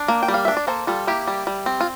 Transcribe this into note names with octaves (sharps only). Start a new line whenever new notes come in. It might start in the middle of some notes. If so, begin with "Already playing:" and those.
Already playing: D4
A#3
G5
G3
F5
D4 E5
D5
A#3 A4 C5
G3 F4 A4
A#3 E4 G4
G3
G3
C4
F4